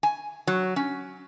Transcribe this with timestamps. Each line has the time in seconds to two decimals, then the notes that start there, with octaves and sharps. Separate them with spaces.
0.03 G#5
0.47 F#3
0.76 C#4